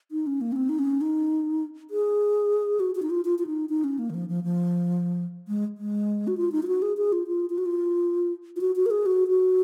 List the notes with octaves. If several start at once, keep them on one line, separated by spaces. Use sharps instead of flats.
D#4
C#4
A#3
C#4
C4
D#4
C#4
D#4
G#4
F#4
F#4
D#4
F4
F4
F4
D#4
D#4
C#4
A#3
D#3
F3
F3
F3
G#3
G#3
F#4
F4
D#4
F4
F#4
G#4
G#4
F4
F4
F4
F#4
F4
F4
F#4
F#4
A#4
G#4
F#4
F#4